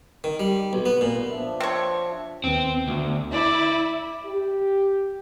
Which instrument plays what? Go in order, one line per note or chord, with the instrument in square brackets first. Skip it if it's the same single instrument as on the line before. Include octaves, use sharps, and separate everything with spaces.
[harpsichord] D#3
G3
B1
B3
A#2
[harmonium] F3 D4 E5
[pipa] C4 C#5
[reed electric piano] D#2 B3 [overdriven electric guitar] C4
[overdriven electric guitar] D2
[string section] E4 [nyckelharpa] D5
[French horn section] G4